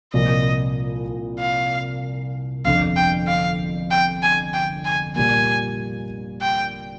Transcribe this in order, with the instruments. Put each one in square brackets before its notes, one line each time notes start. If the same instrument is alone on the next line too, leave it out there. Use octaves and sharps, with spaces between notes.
[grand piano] C2 A#2 F3 A#3 [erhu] D#5
[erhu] F5
[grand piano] G1 F2 D3 [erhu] F5
[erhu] G5
F5
G5
G#5
G5
G#5
[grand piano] A#2 G3 A#3 [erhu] G#5
[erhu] G5